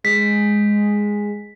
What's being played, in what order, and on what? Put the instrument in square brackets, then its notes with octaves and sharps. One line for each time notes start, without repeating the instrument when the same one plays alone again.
[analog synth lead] G#3 [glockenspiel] B6